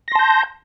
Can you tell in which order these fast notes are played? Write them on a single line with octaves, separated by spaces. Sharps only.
A#6 C6 A5 G6